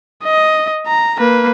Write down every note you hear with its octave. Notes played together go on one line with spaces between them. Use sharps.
D#5
A#5
A#3 B4